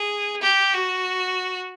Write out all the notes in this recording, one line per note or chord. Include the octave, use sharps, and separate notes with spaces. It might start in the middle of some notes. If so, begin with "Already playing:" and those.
Already playing: G#4
G4
F#4